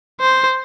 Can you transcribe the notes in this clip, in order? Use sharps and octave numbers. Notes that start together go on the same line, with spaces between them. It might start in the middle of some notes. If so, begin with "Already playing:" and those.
C5